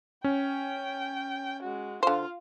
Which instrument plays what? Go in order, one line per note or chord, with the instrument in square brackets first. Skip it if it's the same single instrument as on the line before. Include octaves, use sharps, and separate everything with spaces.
[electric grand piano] C#4 [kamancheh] G5
[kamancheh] G#3 F#4
[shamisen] D3 C5 [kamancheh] F4 F5